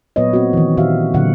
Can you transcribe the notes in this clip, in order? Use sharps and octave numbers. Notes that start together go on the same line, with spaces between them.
A#2 F#3 B3 B4 C#5 D#5
C4 F#4
D#3 E3
A#2 D#3 F#4 G4 E5 F5
A#2 D3 D#3 F#3 F#5